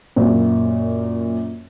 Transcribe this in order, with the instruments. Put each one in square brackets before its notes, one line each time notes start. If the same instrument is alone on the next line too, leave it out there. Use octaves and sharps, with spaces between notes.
[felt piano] F#2 A#2